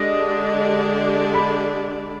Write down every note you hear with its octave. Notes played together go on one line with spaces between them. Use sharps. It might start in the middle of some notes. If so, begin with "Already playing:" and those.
Already playing: D3 G#3 D4 G4 D5 D#5
B5